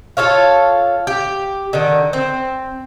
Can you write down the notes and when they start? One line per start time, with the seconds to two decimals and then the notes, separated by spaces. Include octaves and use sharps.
0.17 F4 A4 C#5 F5
1.07 G4
1.73 D3 D#3
2.13 C4